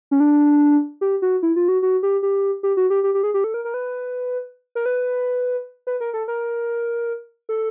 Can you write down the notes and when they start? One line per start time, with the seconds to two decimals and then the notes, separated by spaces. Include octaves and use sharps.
0.11 C#4
0.20 D4
1.01 G4
1.22 F#4
1.43 E4
1.56 F4
1.68 F#4
1.82 F#4
2.03 G4
2.23 G4
2.63 G4
2.77 F#4
2.90 G4
3.04 G4
3.14 G4
3.23 G#4
3.34 G4
3.44 A4
3.54 A#4
3.65 A#4
3.74 B4
4.75 A#4
4.86 B4
5.87 B4
6.00 A#4
6.14 A4
6.28 A#4
7.49 A4